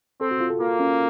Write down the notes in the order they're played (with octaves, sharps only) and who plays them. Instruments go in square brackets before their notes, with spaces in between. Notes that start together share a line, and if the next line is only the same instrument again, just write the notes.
[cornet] C4 [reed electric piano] A4
[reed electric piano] F#4
F4
A4
[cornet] A#3 [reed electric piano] F4
[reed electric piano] C#4